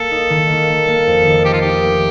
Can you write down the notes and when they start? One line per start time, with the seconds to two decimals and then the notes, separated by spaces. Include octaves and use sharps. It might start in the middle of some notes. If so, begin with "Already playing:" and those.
Already playing: A#3 A4
0.11 D#4
0.30 D#3
0.49 A#3
0.69 A#3
0.88 A#3
1.07 F2
1.26 D#3
1.45 G4 A#4
1.53 F4
1.61 D#4 G4
1.84 A3